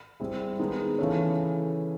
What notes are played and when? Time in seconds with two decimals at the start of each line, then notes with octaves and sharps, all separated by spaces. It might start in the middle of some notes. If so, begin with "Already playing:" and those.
0.20 G3 C4 E4 G#4
0.59 D#3 G#3 B3 D#4
0.98 C#3 E3 A3 C#4